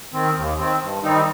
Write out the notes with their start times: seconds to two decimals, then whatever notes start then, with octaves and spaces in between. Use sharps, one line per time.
0.13 D#3 C4
0.36 D#2
0.58 D#3 C4
0.81 G2
1.03 D#3 G3 C4 D#4